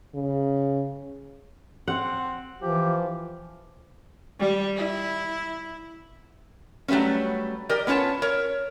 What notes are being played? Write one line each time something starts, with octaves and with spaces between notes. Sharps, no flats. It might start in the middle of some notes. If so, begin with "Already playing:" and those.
C#3
C4 F#5
E3 F3 G4
G3
E4
F#3 G3 A3 B3 C#4
G4 A#4 D5 D#5
B3 C#4 F4 C#5 A5
A#4 C#5